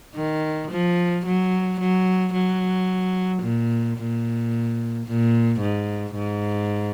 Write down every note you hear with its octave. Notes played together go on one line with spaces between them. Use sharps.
D#3
F3
F#3
F#3
F#3
A#2
A#2
A#2
G#2
G#2